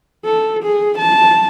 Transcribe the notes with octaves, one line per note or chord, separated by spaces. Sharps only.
A4
G#4
A5